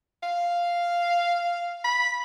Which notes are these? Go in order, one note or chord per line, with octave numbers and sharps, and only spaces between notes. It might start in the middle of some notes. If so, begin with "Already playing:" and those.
F5
B5